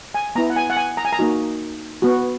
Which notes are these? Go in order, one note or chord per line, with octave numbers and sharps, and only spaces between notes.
G#5
B3 E4 A#5
F#5
G#5
F#5
G#5
A#5
G#5
A#5
A#3 D#4 F#4
B3 F#4